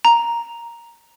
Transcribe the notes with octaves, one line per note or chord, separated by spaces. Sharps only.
A#5